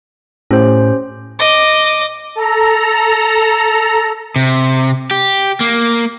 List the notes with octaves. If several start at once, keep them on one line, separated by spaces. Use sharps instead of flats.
A2 C#4 G4 C5
D#5 D6
A4 A#5
C3
G4
A#3